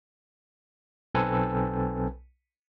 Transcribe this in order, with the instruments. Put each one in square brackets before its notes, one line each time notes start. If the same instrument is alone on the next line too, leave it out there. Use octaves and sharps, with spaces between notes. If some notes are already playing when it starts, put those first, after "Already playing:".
[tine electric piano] B1 C4 A4 B4 G#5